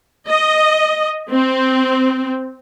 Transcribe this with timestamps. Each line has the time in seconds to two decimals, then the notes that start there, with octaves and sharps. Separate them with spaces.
0.28 D#5
1.30 C4